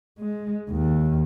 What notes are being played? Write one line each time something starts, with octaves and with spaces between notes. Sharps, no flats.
G#3
D#2